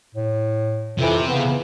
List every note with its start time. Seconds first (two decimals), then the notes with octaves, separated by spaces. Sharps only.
0.15 A2
0.98 F2 C3 E3
1.28 C#3 B3